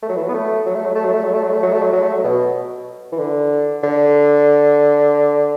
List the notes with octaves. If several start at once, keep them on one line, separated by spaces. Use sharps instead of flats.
A3
F#3
E3
F#3
B3
A3
F#3
A3
F#3
A3
F#3
A3
F#3
A3
F#3
A3
F#3
A3
F#3
F#3
A3
F#3
B2
E3
D3
D3